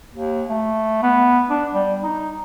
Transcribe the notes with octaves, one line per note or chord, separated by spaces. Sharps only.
D#2
A3
B3
D4
G3
D#4